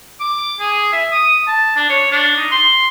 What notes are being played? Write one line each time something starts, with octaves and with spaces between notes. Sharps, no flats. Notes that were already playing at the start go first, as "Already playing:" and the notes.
D6
G#4
E5
D#6
A5
D4
C#5
D4
D#4
C6